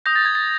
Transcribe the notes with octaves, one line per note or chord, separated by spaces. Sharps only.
D#6 G6 A#6
A6
G#6
A6